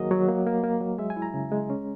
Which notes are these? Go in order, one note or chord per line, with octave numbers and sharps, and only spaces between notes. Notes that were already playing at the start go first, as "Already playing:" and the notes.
Already playing: D#3 F#3 A#3 F#4 G#4 A#4 D#5
F#3
A#3
A#3
A#3
F#3
G#3 E5
G#5
E4
A#5
C#3
G#3
C#4